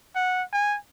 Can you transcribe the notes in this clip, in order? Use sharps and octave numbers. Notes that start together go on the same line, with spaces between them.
F#5
G#5